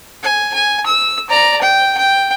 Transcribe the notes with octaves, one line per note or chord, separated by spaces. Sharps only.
G#5
G#5
E6
D5 A#5
G5
G5